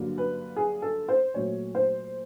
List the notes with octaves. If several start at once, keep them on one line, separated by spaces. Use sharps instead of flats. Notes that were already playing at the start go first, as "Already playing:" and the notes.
Already playing: G2 D3 F#3 A#3
B4
G#4
A4
C5
A#2 F#3 A3 C#5
C5